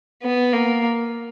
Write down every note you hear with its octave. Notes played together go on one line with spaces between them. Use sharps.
B3
A#3